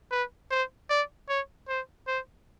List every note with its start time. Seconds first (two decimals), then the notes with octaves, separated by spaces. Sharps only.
0.11 B4
0.51 C5
0.90 D5
1.29 C#5
1.69 C5
2.07 C5